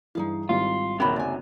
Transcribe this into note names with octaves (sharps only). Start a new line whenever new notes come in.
G2 E3 D#4 G#4 F5
G#1 G3 E4 F4
D#1 C3 F#3 A#4 C#5 B5
F#1 D5 G#5